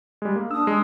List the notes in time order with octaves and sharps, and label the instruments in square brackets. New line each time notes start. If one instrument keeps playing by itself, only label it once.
[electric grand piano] G3 G#3
A#3
[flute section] D4 D#6 [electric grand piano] E6
[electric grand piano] G#3